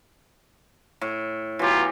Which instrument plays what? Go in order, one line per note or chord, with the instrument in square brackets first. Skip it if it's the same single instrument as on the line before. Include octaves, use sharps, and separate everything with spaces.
[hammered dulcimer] A2
[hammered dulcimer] E3 G4 [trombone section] F#3 B3 F4